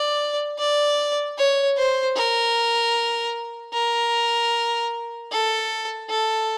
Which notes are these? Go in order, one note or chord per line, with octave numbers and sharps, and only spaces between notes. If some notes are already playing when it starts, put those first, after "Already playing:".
Already playing: D5
D5
C#5
C5
A#4
A#4
A4
A4